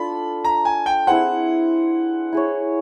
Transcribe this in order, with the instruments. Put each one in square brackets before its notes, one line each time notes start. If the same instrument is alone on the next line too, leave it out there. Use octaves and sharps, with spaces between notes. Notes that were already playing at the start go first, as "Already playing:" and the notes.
Already playing: [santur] D4 F4 A4 [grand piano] B5
[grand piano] A#5
G#5
G5
[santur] C4 E4 G#4 C5 [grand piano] F#5
[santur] E4 G#4 C#5